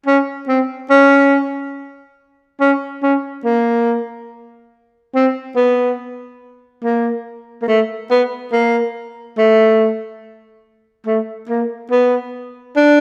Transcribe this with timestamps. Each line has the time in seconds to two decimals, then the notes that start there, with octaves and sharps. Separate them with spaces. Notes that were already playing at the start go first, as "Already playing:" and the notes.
0.06 C#4
0.48 C4
0.90 C#4
2.60 C#4
3.03 C#4
3.44 A#3
5.15 C4
5.56 B3
6.84 A#3
7.62 A#3
7.68 A3
8.10 B3
8.52 A#3
9.38 A3
11.07 A3
11.49 A#3
11.91 B3
12.76 D4